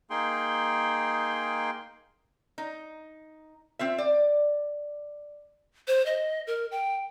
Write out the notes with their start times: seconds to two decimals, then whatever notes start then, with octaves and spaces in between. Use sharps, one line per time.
0.10 A#3 D#4 G#4 G5 C6
2.58 D#4
3.79 C4 F4 E5
3.98 D5
5.88 C5
6.06 D#5
6.47 A#4
6.71 G5